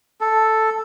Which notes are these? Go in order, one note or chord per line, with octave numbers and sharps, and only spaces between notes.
A4